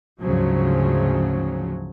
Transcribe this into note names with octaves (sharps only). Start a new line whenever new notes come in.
D2 G#2 C#3 F3 F#3